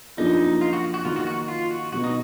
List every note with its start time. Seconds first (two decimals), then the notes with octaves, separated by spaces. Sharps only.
0.17 F#2 F3 A#3 D4 D#4 F4
0.61 F4
0.73 F#4
0.94 F#4
1.05 D#3 F#3 A#3 F4
1.16 F#4
1.27 F#4
1.48 F4
1.71 F#4
1.92 B2 F#3 B3 F#4
2.04 D#4